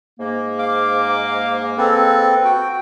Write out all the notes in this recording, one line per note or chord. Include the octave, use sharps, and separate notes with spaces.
G#2 A#3
F5 D6
C4 A4 B4
F#4 G5